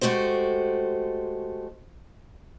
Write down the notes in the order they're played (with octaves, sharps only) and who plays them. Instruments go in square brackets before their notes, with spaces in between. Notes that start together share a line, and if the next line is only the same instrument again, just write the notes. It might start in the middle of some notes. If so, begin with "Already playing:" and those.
[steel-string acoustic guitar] G#3 A3 F#4 G4 C5